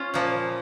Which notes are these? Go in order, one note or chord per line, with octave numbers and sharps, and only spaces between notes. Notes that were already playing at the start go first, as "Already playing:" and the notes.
Already playing: C#4 F4
A#2 F3 A#3